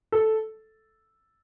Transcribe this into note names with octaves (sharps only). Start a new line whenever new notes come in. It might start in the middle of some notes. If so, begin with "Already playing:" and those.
A4